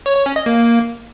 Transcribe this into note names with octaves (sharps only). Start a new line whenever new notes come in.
C#5
C#5
C#4
D#5
A#3